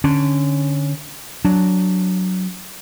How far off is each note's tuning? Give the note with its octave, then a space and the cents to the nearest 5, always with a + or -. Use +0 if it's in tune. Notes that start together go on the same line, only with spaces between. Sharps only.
D3 +0 C#4 +0
F#3 +0 D4 -10